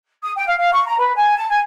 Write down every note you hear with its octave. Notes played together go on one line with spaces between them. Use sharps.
D#6
G5
F5
F5
C#6
A#5
B4
G#5
A5
G#5